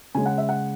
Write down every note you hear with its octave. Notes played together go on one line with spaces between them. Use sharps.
C#3 G#3 C#4 G#5
F#5
E5
F#5